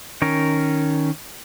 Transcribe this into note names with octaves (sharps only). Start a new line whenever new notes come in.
D#3 C#4 A#4